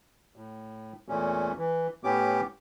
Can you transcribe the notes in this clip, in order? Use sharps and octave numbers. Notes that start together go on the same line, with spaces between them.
A2
E2 A#2 A3 C#4
E3
A2 B3 C#4 G4 D6